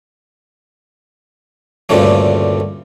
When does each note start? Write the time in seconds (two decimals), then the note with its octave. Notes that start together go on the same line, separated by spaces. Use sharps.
1.89 D2 G2 A#2 C#3 G3 A3